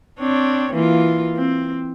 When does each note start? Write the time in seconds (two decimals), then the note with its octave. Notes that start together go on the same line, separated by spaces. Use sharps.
0.20 C4 D4 C#5
0.73 E3 A#3 F4
1.36 C4